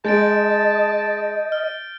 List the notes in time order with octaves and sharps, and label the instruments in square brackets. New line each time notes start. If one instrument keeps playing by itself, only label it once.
[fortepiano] G#3 [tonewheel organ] D#5 [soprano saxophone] A5 [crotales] G6 A6 D7
[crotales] F6